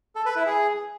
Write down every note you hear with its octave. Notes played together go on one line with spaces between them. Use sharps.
A4
B4
E4
G#4